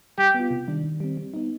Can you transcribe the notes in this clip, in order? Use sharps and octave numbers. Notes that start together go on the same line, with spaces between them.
G3 G4
B3 F4
C3
D#3 G3 D4
D#3
G3 C4
G3
B3 D#4